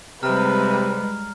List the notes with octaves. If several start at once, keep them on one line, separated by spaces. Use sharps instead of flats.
C3 G3 G#3 B4 A#5 F6